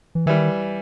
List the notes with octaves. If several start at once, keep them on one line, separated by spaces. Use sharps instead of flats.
E3
D#3 E3 G3